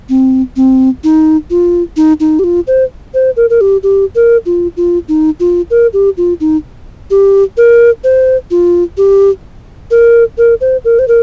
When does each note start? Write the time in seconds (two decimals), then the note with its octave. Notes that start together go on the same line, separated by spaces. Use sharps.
0.09 C4
0.56 C4
1.04 D#4
1.50 F4
1.97 D#4
2.20 D#4
2.39 G4
2.44 F4
2.67 C5
3.14 C5
3.37 A#4
3.50 A#4
3.61 G4
3.83 G4
4.15 A#4
4.46 F4
4.77 F4
5.08 D#4
5.40 F4
5.70 A#4
5.93 G4
6.17 F4
6.40 D#4
7.11 G4
7.57 A#4
8.04 C5
8.51 F4
8.97 G4
9.91 A#4
10.38 A#4
10.61 C5
10.85 A#4
10.99 C5
11.08 A#4